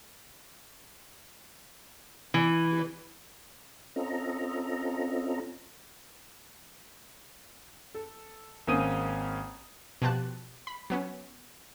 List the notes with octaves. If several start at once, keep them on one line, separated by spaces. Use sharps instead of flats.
E3
C4 C#4 F4 A4 D#5 A#5
A4
G#1 A#3 C4 C#4 D#6 D#7
B2 F3 G4 A5 F#6
B5
F#3 B3 C#4